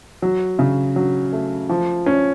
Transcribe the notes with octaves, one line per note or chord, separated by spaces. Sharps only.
F#3
C#3
F#3
A3
F3
C#4